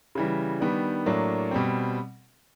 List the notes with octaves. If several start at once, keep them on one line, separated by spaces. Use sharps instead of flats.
C#3 E3 G3
D#3 G3 B3 D4
A2 F#3 A#3 D4
B2 G3 C4